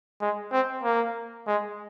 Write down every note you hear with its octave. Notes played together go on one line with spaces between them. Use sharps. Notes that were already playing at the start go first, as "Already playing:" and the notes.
G#3
C4
A#3
G#3